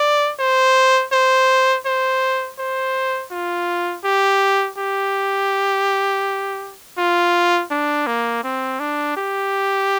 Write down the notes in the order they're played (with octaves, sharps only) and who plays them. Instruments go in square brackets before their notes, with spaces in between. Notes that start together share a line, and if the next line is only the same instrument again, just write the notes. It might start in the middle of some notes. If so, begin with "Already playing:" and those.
Already playing: [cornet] D5
C5
C5
C5
C5
F4
G4
G4
F4
D4
A#3
C4
D4
G4